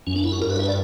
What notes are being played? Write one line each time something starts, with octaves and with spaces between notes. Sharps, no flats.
F#2 C#4
D4
E4
F#4
G2 A#4
B4
E5
D5